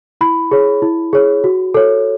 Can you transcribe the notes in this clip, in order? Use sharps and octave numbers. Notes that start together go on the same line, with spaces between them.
E4 B5
G#4 C#5
E4
G#4 C#5
F#4
A4 C#5